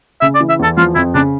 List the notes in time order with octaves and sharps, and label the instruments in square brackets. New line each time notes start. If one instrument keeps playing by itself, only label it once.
[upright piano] C#3 [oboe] E5
[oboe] D5
[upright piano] E3
[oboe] E5
[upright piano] E2 [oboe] A4
[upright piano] F3 [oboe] F4
[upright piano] F2 [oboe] E4
[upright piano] C#3 [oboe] D4